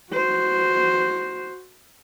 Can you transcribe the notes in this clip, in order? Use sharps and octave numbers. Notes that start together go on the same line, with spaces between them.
F#4 C5